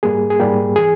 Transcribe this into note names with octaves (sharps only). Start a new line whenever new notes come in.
G#2 G3 A#3 G#4
G#4
G#2 G3 A#3 G4
E3 G#4